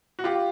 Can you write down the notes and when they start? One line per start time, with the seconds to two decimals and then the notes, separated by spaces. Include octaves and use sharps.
0.19 F#4
0.24 F4 G4